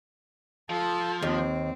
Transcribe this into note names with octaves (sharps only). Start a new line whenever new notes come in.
F3 A4
D#2 C4